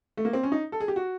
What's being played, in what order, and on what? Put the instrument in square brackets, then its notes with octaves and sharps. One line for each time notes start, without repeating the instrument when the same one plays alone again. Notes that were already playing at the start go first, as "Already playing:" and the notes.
[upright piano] A3
A#3
C4
C#4
D#4
A4
G#4
G4
F#4